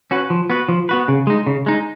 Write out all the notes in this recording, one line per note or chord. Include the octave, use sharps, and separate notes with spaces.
C#4 F#4 B4
F3
B3 F#4 B4
F3
B3 F#4 B4
C#3
G#3 D#4
C#3
G#3 D#4